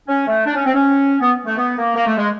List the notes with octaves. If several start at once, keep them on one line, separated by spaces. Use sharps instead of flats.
C#4
A3
D4
C#4
C4
C#4
B3
A3
B3
A#3
A#3
A3
G#3